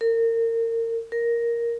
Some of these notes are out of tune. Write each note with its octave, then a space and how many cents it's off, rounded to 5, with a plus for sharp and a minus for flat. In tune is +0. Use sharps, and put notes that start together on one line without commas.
A#4 -30
A#4 +5